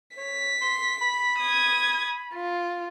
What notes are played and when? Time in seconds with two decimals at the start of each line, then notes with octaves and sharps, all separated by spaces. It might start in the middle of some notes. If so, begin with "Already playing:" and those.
0.17 C#5 B6
0.61 C6
1.01 B5
1.39 D#6 G#6
2.34 F4